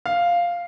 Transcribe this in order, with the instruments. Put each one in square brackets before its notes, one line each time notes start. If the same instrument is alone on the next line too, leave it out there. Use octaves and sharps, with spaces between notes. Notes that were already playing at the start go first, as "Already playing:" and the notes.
[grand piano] F5